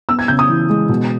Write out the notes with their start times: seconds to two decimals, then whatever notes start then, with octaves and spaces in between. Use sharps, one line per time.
0.09 B3 E6
0.19 G#6
0.28 C#3 G6
0.39 D#6
0.50 E3
0.70 G#3
0.89 B2